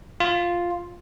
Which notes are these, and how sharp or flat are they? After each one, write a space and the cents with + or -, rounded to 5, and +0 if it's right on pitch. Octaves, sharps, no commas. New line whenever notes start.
F4 +0